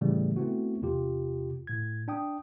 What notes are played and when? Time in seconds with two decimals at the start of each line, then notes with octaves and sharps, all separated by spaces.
0.01 A2 C#3 E3 G3 A3
0.36 A3 B3 C4 E4 F#4
0.82 E2 C3 F4 G4
1.67 A2 G#6
2.08 D4 G5 D#6